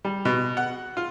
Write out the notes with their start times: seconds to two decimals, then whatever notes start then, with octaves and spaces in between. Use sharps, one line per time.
0.05 G3
0.25 B2
0.57 F#5
0.97 F4